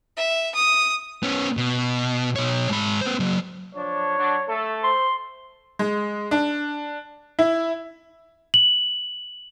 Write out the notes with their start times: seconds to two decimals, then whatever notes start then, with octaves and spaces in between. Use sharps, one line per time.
0.17 E5
0.55 D#6
1.23 B3 C#4
1.57 B2
2.36 B2 C#5
2.69 G#2 B5
3.01 B3 C5
3.20 F#3 A#3
3.75 F3 D4 C#5
4.18 F#3 D4
4.48 A3 A4
4.83 C5 C6
5.79 G#3
6.31 D4
7.39 E4
8.54 F#7